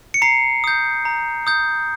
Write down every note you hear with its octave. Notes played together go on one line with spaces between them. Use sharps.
C#7
A#5 C7
D#6 G6
A#5
D#6 G6